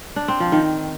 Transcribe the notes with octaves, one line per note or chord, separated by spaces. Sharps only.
D4
C4
F3
D#3